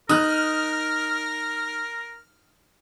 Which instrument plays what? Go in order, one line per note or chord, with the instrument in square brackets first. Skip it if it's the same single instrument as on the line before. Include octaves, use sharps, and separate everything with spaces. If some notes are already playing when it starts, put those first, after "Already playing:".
[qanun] D#4 [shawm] A#4 [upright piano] D#6 F#6 [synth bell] F6